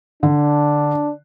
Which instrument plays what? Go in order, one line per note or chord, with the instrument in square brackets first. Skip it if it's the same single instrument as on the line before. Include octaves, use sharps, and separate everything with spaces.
[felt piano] D3 [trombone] D4